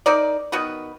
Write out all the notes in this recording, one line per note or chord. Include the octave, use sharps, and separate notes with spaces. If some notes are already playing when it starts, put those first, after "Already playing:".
D#4 A#4 D5
D#3 B3 F#4 B4